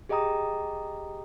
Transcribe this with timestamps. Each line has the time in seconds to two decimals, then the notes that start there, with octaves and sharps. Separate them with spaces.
0.09 G4 G#4 D#5 G5 A#5 D#6